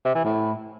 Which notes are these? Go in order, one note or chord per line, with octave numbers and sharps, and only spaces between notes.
C3
E3
A2